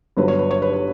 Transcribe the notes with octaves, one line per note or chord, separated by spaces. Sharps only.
G1 G2 F#3 B4
C#5
B4
C#5
B4
C#5